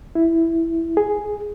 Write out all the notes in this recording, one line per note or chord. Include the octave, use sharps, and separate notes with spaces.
E4
G#4